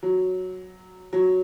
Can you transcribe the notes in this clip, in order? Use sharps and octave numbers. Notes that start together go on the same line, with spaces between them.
F#3
F#3